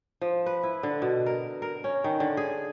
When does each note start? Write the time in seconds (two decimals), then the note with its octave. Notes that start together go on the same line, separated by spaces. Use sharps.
0.21 F3
0.46 B4
0.63 E4
0.83 D3
1.02 B2
1.26 A#4
1.62 A#4
1.84 C#4
2.04 D#3
2.20 D3
2.37 G#4